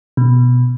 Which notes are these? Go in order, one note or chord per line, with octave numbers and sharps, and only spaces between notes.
B2